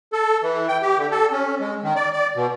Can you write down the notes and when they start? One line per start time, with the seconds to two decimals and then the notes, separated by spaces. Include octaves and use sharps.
0.13 A4
0.43 E3
0.68 G5
0.82 G4
0.98 D3
1.11 A4
1.32 C#4
1.60 G#3
1.83 D#3
1.96 D5
2.13 D5
2.36 B2